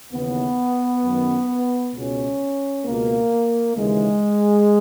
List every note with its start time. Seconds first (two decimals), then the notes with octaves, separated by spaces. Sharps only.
0.12 D#2 C#3 E3 B3
1.04 F#2 D#3
1.94 C#2 B2 C#4
2.85 C#2 B2 A#3
3.76 D#2 C#3 E3 G#3